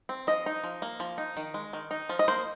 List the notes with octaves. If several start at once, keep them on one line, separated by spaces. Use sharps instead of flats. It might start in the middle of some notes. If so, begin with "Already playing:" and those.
C4
F3 D#5
D#4
F3
A#3
F3
D#4
D#3
G#3
D#3
D#4
F3
D#5
A#3 C5